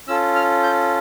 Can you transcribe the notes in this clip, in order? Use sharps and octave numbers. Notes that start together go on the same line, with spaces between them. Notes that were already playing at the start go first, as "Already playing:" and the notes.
C#4 F4 A4 E6
F6
G6